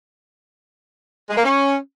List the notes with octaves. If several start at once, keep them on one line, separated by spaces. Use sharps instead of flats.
G#3
A#3
C#4